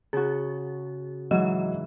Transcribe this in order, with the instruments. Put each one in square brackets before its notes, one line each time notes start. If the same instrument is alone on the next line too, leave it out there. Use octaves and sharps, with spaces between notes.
[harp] C#3 F#4 [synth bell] G#4
[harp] G#2 E3 [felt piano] F#3 [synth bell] D#5